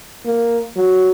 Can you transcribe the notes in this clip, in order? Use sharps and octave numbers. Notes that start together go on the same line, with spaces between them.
A#3
F#3